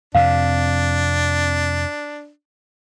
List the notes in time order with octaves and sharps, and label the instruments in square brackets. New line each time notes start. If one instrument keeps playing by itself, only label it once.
[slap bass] F2 C3 [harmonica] D4 [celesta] F5